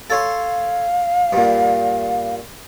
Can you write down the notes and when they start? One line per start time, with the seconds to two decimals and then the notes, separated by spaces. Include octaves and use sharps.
0.10 A4 C#5 F5 C6
1.32 G2 A#2